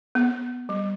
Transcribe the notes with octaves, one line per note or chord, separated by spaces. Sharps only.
B3
G3